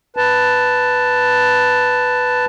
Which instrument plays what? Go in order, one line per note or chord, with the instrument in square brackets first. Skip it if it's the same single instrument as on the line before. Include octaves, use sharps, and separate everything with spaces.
[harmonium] B4 A5